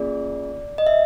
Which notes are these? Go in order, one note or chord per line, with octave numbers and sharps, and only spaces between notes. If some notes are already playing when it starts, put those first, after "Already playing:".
Already playing: A#3 C#4 F4 G#4 D5
D#5
E5